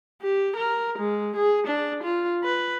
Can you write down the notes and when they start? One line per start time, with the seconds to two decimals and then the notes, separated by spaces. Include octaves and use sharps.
0.21 G4
0.57 A#4
0.98 G#3
1.36 G#4
1.68 D4
2.03 F4
2.44 B4